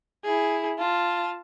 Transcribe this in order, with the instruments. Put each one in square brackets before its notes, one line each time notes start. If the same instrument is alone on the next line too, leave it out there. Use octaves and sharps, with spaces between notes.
[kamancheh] E4 G#4
F4 A5